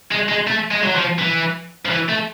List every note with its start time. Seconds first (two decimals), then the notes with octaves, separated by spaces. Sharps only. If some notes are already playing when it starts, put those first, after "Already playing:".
0.11 G#3
0.29 G#3
0.47 A3
0.71 G#3
0.83 F#3
0.95 F3
1.19 E3
1.85 F3
1.90 E3
2.09 A3